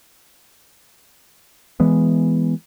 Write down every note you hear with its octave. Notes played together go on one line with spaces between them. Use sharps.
E3 G#3 B3